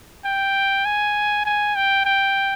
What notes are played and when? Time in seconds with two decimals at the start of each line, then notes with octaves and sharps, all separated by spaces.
0.25 G5
0.85 G#5
1.46 G#5
1.76 G5
2.05 G5